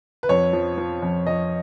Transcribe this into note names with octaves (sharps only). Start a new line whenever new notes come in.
B4
F2 C#5
F3
F3
F2
F2 D#5